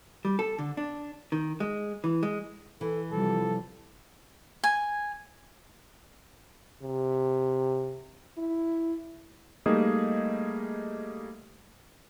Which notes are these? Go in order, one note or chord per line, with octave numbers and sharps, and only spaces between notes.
G3
A4
D3
D4
D#3
G#3
E3
G#3
E3 A4
C3 F3 G3 A4
G#5
C3
E4
G3 A3 A#3 D#4 G#4 D#5